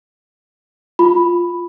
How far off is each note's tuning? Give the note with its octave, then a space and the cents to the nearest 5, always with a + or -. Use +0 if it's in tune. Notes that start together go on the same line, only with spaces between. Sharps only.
F4 +0 B5 +0